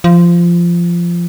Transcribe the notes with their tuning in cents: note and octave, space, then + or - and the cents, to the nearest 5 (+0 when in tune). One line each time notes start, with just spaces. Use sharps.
F3 -15